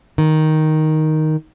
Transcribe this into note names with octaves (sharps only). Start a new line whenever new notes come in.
D#3